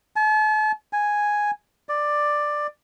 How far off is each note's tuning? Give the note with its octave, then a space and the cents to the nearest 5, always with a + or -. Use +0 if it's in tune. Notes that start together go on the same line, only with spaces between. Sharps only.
A5 -40
G#5 +0
D5 +10